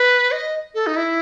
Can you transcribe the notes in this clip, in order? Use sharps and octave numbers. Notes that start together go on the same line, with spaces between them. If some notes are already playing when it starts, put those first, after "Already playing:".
Already playing: B4
D#5
A4
D#4
E4